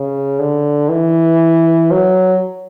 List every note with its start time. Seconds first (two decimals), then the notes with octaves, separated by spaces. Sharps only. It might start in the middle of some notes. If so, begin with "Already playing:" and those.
Already playing: C#3
0.39 D3
0.89 E3
1.91 F#3